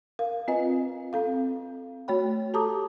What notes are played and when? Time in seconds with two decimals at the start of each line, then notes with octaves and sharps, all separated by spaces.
0.19 A#4 F5
0.48 C4 F4 B4 D#5 G#5
1.13 C4 A4 F5
2.08 A3 F#4 C#5 G5 B5
2.54 G4 A4 A5 A#5 D6 D#6